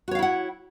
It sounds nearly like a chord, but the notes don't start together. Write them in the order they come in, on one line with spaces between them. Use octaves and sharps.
F#4 C#5 F5 E4 F#5